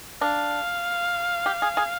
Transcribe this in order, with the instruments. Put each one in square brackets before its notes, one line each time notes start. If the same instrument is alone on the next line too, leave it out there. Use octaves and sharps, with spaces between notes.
[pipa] D4 [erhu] F5
[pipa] G4
G#4
G#4